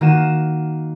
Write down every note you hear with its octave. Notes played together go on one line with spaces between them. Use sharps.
D#3 A#3 F#4 D#7 E7